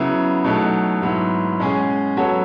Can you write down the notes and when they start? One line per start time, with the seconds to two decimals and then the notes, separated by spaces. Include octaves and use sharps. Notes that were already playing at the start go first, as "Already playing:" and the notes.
Already playing: C#3 F#3 B3 E4
0.44 B2 F#3 A3 D#4
1.02 G#2 F#3 B3 E4
1.59 B2 G#3 C#4 G#4
2.17 F#3 B3 F#4 A4 C#5